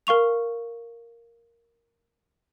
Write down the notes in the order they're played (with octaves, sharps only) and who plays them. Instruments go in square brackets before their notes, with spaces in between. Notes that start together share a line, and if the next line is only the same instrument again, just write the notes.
[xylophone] A#4 F5 C#6 F7